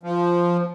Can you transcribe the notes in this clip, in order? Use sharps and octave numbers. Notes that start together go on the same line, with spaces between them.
F3